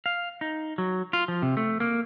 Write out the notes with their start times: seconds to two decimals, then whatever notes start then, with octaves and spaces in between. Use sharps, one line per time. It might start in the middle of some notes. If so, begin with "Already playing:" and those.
0.06 F5
0.41 D#4
0.78 F#3
1.13 F4
1.28 F3
1.42 C3
1.57 A3
1.80 A#3